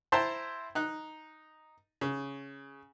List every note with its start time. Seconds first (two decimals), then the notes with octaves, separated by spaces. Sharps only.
0.12 E4 C5 G5 A5 A#5 C6
0.75 D#4 F#6
2.01 C#3